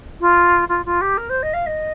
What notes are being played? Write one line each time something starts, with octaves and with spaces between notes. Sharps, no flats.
F4
F4
F4
G4
A#4
C5
D#5
F5
D#5